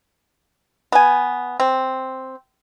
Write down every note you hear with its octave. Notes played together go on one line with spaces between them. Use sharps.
B3 G#5
C4